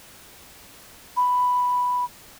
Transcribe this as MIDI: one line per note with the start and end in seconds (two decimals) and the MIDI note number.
1.17 2.05 83